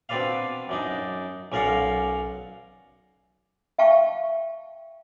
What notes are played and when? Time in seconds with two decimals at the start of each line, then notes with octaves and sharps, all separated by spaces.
0.09 B2 C4 D4 B4 D5 F5
0.69 F#2 D4 D#4
1.52 B1 C#4 A#4 D5 F5 F#5
3.78 E5 F5 G5 A5 C#6